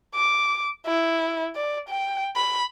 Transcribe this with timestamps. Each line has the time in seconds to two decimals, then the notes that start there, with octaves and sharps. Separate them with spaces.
0.15 D6
0.87 E4
1.55 D5
1.89 G5
2.36 B5